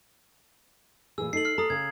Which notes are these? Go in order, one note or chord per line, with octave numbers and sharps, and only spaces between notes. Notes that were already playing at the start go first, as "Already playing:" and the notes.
A#2 E3 G#4 E6
D#4 A4 C7 F#7
F6 C7
A4 A#5 D#6
C#3 G#6